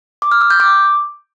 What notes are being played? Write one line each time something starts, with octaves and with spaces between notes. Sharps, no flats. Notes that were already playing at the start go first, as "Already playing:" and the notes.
D6
F6
E6
G6
D6